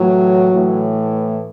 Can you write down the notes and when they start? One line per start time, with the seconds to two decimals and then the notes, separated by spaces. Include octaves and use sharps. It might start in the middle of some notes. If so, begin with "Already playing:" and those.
Already playing: A2 E3 F#3
0.52 A2 E3